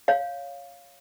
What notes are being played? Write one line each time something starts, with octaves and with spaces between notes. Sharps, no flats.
C#5 F5